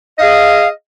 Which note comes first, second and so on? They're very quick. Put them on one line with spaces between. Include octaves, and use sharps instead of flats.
D#5 F5 G#4